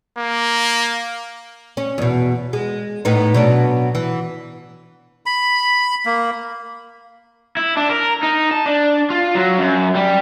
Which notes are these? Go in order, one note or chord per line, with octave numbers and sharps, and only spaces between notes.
A#3
C#4
E2 B2
G#3
A2 B3 D#4
B2 F#3 D4
E3
B5
A#3
E4
D4
A#4
D#4
A5
D4
F4
F#3
F#2
G3